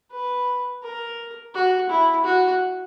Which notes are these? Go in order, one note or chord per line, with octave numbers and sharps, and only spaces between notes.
B4
A#4
F#4
E4
F#4